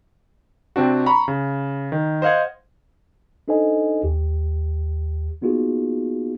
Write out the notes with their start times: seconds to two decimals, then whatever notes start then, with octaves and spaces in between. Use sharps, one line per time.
0.76 C3 C4 D4 F#4
1.06 A#5 B5 C#6
1.28 C#3
1.92 D#3
2.22 C5 D#5 F5 F#5 G#6
3.48 D4 D#4 A4 C5 D#5 G#5
4.03 D#2 G4
5.42 A#3 B3 D#4 F4 F#4 G#4